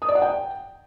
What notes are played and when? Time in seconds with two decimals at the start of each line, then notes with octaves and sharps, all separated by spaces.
0.02 D#6
0.08 D5
0.15 F#5
0.22 G5